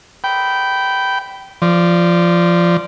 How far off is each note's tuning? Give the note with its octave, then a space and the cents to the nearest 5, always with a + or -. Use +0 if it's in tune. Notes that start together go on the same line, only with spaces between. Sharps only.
G5 -15 B5 +0
F3 -15 D5 +0